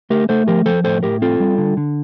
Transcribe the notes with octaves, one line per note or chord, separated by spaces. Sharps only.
A3 G4 A#4
A3 A4 C5
F3 G4 A#4
F3 A4 C5
A2 A4 C5
A2 G4 A#4
C4 F4 A4
G3
D3
D3